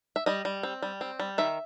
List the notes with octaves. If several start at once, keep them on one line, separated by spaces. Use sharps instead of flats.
E5
G3 D#5
G3
C4
G3
C4
G3
D#3 E5